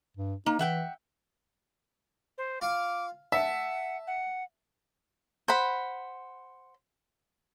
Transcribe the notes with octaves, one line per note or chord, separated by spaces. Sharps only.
G2
A#3 D#4
E3 E5 F#5 G5
C5
F4 F5 D6
E5 F#5 A5
F#5
C5 F#5 B5